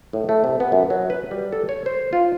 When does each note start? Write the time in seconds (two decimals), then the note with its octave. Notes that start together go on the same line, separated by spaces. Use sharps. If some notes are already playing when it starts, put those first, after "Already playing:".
0.13 A2
0.29 A3
0.44 C3
0.60 B3
0.72 F#2
0.90 F#3
1.10 B4
1.31 G3
1.52 A4
1.69 C#5
1.86 C5
2.13 F4